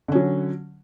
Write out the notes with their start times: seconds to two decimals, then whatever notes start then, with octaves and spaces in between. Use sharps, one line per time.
0.08 D3
0.12 C#4
0.15 F#3